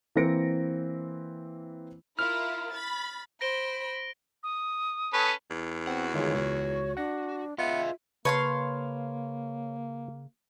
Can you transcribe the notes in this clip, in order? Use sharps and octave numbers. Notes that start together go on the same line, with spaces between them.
E3 A#3 C4 A#6 C#7 D7
E4 F4 A#4 F6
B5 A6
C5 B5 A#6 D7 G7
D#6
C#4 A4 B4
E2
C4 F#4 F#5
D3 D#3 G3 G#3 F4 F#4 C#5
C#2 F#4
D4 F#5 A#6
B3 F4 G#4 B4 D#5 E5
C#3 A#3 B4 C#5 F5 A5 C6